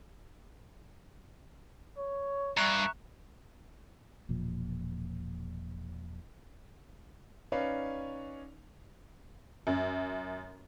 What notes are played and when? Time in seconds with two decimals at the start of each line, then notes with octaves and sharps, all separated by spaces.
1.97 C#5
2.57 G2 E5 A#5 C#6 F#6 E7
4.29 E1 A#2 F3
7.52 C#4 D#4 B4 C#5 D5 F5
9.67 F#2